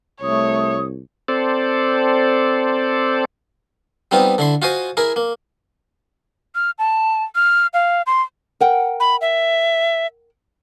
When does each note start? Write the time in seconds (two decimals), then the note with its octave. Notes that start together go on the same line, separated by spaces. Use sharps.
0.22 C2 A3 C#5 D#6
1.28 C4 A4 C5 D5
4.11 G3 B3 C4 D#4 F4
4.38 D3 E4 C6
4.62 F4 F#4 C5 D#5 G#5 C6
4.97 E4 G#4 A#4
5.16 A#3
6.55 F6
6.79 A5
7.35 F6
7.74 F5
8.07 C6
8.60 A#4 F#5 G5
9.00 B5
9.21 E5